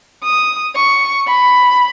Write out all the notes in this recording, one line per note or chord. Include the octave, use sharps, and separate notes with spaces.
D#6
C#6
B5